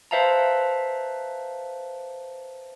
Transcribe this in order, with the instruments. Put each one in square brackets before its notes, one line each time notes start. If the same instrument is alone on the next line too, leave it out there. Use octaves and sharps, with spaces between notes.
[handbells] B4 C5 E5 F5 A5 A#5